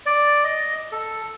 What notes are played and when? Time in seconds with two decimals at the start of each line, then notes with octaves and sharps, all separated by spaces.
0.06 D5
0.44 D#5
0.92 A4